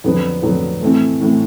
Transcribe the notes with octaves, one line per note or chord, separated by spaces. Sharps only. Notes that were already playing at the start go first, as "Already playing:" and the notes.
F2 D3 F#3 B3
F2 D3 F#3 B3
A2 E3 A3 C4
A2 E3 A3 C4